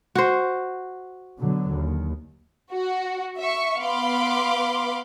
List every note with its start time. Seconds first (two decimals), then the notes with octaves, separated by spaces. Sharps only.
0.15 F#4 C5
1.38 B2 D3 F#3
1.70 D#2
2.72 F#4
3.38 E5 C#6
3.81 B3 F5 B5 C6 D6